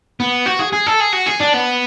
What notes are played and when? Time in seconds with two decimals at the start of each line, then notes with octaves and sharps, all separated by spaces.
0.20 B3
0.46 F#4
0.59 G#4
0.73 G#4
0.87 A4
1.00 G#4
1.13 F#4
1.26 G#4
1.40 D4
1.54 B3